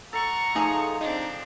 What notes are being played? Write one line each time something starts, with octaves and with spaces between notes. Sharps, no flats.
A4 F#5 A#5 C#6
F3 A3 D#4 G#4
C4 D4 D#4